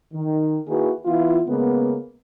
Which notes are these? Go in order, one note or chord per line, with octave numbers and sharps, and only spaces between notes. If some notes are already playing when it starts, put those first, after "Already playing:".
D#3
D#3 A#3 E4 F#4 G#4 B4
E3 B3 E4 F4
C#3 G#3 A#3 B3